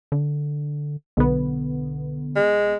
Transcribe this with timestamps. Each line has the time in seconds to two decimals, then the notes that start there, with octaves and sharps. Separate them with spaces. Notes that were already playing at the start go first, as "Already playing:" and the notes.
0.12 D3
1.17 B1 D3 B3
2.36 G#3